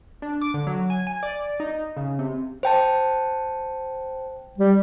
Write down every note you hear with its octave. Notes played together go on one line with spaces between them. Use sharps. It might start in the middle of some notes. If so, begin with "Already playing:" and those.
D4
D6
D3
F#3
G#5
G#5
D5
D#4
C#3
C3
C5 G5 A5
G3